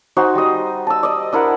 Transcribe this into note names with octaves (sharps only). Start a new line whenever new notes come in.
D#4 F#4 C5 G#5
G3 D#5
A5 E6
D5 D#5
D4 E4 A#4 F#5